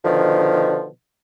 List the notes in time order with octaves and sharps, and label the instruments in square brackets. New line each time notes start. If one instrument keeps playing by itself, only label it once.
[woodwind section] B2 D3 D#3 F3